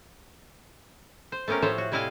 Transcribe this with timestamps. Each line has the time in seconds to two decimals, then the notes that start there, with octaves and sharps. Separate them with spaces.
1.32 C5
1.48 A3 B3 C#4 G4 A#4
1.62 A2 F3 C5 C#5 E5
1.78 F#4
1.92 C3 G3 E4 D#5 F5 G#5